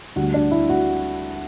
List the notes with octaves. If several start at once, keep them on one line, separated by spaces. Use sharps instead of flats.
D2 D3 G3 F#4
D4
E4
F#4